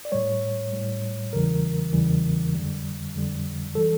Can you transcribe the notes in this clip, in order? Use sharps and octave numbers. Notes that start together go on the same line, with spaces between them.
D5
A2 G3 C#5
A2 G3
E2 C#3 E3 G3 A#4
E2 C#3 E3 G3
F2 D3 G3
F2 D3 G3
E3 G3 A4